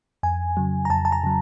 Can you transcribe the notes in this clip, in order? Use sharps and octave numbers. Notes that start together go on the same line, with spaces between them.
F2 G#5
C#3 F#3
A#5
F2 A5
A5
A#5
C#3 F#3